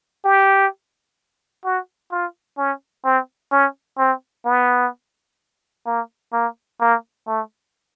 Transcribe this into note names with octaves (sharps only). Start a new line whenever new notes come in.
G4
F#4
F4
C#4
C4
C#4
C4
B3
A#3
A#3
A#3
A3